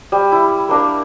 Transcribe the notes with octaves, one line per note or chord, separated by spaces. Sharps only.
G3
E4
A#3 D4 A#4